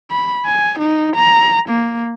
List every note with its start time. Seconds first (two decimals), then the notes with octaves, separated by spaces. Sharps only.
0.11 B5
0.46 G#5
0.79 D#4
1.16 A#5
1.69 A#3